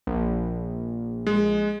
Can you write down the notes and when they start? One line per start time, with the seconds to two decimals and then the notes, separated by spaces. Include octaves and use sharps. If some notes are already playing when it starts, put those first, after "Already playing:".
0.07 A#1
1.27 G#3